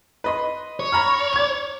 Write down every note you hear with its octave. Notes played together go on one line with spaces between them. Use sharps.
B4 D#5 C6
C#5
A#5 B5 F6
G#6 F7